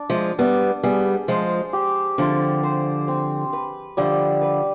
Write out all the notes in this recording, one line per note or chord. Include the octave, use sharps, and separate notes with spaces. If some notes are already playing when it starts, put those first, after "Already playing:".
Already playing: D4
F3 G#3
G3 B3 D4
G3 B3 G#4
F3 G#3 C5
G4
D3 F3 C4
C5
C4
B4
D3 F3 G3
B4